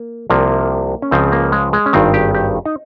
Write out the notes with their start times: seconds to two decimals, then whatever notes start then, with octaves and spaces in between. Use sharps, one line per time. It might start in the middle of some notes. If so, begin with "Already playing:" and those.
Already playing: A#3
0.30 C2 C3 F3 A#3
1.02 C#4
1.11 C#2 C#3 F3 C4
1.32 A#3
1.52 G#3
1.73 G#3
1.86 C#4
1.93 G#1 G2 D#3 C4
2.14 G4
2.35 G4
2.66 D#4